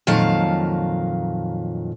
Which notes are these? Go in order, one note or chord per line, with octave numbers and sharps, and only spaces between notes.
F2 A#2 D#3 F#3 F5 A5